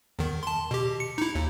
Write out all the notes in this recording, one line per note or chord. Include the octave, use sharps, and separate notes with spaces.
E2 D#3
A5 C6
B2 G4
C#7
D#4 E4
D#2